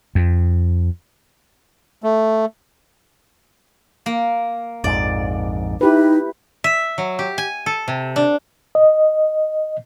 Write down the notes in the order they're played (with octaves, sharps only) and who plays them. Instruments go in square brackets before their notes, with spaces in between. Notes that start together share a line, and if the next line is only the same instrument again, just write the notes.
[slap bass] F2
[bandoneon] A3
[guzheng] A#3
[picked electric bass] A#1 F2 G#2 [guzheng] D5
[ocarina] D#4 [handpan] E4 G4 B4
[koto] E5
F#3
G4
G#5
A4
C3
D4
[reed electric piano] D#5